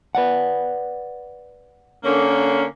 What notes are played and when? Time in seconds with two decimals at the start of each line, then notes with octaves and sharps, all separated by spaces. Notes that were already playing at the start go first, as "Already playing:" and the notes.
0.15 B4 D5 F#5
2.04 D3 A#3 C#4